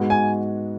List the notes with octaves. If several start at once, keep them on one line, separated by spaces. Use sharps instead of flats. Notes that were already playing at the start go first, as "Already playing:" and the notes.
Already playing: G#2 G#3 B3 F#4 B4
G#5